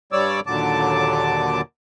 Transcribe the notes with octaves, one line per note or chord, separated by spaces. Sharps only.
G2 G3 C#5 D5 D6 E6
D#2 A#2 D3 F#3 A5 D6